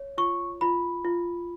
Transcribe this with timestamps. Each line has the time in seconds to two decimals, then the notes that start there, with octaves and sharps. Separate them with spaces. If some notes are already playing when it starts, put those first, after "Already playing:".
Already playing: C#5
0.18 F4 C#6
0.61 F4 B5
1.05 F4